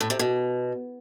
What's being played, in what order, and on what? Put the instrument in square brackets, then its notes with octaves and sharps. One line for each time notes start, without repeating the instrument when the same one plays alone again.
[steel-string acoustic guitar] A2
C3
B2